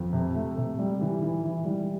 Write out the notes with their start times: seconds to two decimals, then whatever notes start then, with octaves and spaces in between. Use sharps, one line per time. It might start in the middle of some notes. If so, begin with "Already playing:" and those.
Already playing: F2
0.13 C3
0.35 A3
0.57 C3
0.79 G3
1.01 E3
1.22 E3
1.43 E3
1.65 G3